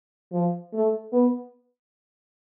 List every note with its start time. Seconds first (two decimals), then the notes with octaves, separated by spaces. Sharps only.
0.32 F3
0.73 A3
1.13 B3